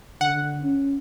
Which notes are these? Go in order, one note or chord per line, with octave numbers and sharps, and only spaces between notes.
D3 F#5
C#4